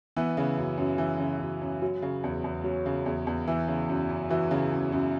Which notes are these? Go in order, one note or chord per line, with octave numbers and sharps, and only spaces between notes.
E3 B3
C#3
F#2
F#2
E3
C#3
F#2
F#2
F#3
C#3
E2
E2
F#3 C#4
C#3
E2
E2
E3
C#3
F#2
F#2
E3 F#4
C#3
F#2
F#2